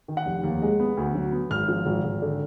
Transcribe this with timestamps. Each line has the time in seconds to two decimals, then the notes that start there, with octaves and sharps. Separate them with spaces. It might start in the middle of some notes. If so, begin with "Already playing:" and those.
0.08 D#3
0.17 F#5
0.26 F1
0.43 D#2
0.62 G#3
0.80 B3
0.97 D2
1.15 F#3
1.32 B3
1.50 G#1 F6
1.68 F3
1.86 G#1
2.04 G#1
2.22 D3